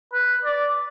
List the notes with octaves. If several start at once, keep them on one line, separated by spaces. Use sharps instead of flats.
B4
D5